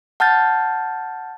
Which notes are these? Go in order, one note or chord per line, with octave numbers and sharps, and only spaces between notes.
F#5 A5 F6 G6 A6